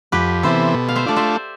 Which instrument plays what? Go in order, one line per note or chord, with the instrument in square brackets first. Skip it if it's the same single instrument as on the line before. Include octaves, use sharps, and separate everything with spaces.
[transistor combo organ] F2 [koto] G4 B4
[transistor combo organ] C3 E3 B3 [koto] A4 C5
[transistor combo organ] B2
[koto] F5
C5 E5
[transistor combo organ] A3 D4 F4 [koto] D5
[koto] C5 E5